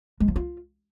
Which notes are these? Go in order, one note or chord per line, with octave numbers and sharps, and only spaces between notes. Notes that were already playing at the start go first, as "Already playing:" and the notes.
G#3
F3
F4